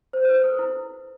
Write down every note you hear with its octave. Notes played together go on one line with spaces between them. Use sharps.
C5
C5
B4
A4
E4